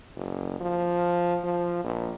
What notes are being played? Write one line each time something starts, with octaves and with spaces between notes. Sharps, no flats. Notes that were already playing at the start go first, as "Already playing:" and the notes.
F#1
F3
F3
A#1